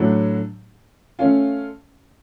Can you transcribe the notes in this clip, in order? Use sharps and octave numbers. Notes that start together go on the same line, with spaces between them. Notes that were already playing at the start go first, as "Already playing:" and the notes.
Already playing: A2 F#3 A3 D4
A3 C#4 F4